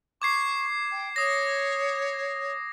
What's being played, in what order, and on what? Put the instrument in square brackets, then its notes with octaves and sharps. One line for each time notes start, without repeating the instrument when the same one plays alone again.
[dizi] C#6 [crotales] D6 G#6 C7
[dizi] G5
[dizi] C#5 [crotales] D#6 A#6